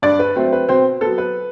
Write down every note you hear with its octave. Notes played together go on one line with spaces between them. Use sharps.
G2 D4 D5
B4
F#3 A3 C4
B4
B2 C4 C5
F#3 B3 A4
B4